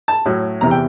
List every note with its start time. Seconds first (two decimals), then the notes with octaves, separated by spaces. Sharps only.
0.08 A5
0.26 A2 F#3
0.61 E2 C3 E3 A#5
0.71 G5